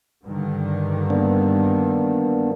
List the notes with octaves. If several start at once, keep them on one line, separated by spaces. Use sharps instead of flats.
G2 D3 D#3
A#3 B3 D4